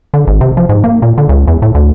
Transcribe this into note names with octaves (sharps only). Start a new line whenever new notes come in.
D3
G#1
C3
F3
G#2
A#3
A#2
D3
C#2
E2
A2
D2